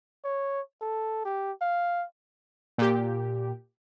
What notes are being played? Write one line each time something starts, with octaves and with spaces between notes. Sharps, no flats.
C#5
A4
G4
F5
A#2 G4